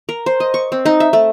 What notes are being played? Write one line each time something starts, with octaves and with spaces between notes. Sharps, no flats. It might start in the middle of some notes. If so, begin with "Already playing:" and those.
A#4
C5
D#5
C#6
C4
D#4
E5
A3